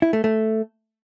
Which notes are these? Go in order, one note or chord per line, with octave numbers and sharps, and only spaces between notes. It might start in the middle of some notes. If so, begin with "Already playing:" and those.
E4
A3
A3